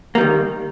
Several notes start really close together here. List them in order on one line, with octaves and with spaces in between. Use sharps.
A#3 G3 D#3